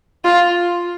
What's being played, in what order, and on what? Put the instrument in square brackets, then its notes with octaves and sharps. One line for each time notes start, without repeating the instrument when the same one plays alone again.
[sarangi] F4